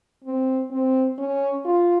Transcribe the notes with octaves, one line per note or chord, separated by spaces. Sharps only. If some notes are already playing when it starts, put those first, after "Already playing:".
C4
C4
C#4
F4